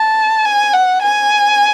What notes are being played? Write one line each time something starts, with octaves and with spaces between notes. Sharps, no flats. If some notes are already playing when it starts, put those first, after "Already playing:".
Already playing: A5
G#5
F#5
G#5